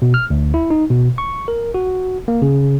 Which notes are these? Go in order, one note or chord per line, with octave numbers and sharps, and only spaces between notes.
B2
F6
D2
E4
D#4
B2
C#6
A#4
F#4
A#3
C#3